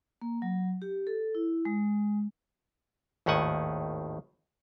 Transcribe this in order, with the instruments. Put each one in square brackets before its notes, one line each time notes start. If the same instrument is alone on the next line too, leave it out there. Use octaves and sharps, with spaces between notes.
[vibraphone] A#3
F#3
G4
A4
E4
G#3
[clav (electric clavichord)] G#1 D#2 A2 D#3 F#5 G#5